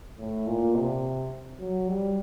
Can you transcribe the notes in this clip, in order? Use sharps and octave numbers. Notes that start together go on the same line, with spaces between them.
A2
A#2
C3
F#3
G3